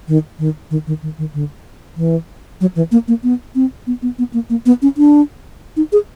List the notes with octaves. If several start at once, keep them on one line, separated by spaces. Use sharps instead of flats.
D#3
D#3
D#3
D#3
D#3
D#3
D3
E3
F#3
E3
A#3
A#3
B3
C4
B3
B3
B3
A#3
A#3
B3
C#4
D4
D#4
G#4